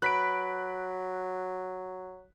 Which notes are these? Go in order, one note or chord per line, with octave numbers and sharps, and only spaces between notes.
F#3 B4 F#6 B6 D7